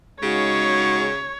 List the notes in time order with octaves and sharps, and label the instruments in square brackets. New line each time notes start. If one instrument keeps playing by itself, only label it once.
[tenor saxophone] C#3 [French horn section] G#3 D#4 F#4 [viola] C#5